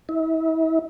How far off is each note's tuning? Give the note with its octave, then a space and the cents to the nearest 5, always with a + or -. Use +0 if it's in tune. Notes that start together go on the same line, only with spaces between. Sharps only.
E4 -40